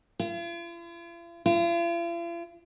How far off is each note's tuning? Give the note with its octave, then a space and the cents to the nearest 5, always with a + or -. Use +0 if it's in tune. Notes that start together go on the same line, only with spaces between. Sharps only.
F4 -45
F4 -45